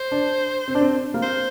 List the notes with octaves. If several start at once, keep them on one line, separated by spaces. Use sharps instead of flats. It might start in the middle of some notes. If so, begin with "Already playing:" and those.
Already playing: C5
D4
C4
D4
C4
A#3
C4 C5